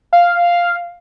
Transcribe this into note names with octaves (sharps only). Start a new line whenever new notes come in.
F5